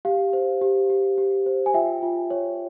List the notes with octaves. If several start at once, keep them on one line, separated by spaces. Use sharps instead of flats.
G4 F5
C5
G4
G4
G4
C5
G#5
F4 E5 G5
F4
C#5